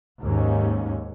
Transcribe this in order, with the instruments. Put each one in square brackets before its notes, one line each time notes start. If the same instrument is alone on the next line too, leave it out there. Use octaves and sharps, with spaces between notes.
[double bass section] D#2 G#2 C#4